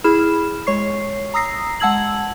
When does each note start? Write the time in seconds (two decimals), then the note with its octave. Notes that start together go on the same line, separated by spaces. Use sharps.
0.04 E4 G#4 B5 F6 E7
0.67 G#3 C#5 C#6 C7
1.34 A#5 D#6 E6 A#6 C7
1.80 G#3 F#5 A5 E6 G#6 F#7